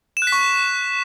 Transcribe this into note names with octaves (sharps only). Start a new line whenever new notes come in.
E7
F#6
B6
C#6